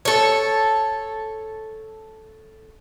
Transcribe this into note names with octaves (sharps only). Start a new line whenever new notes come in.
A4 C#5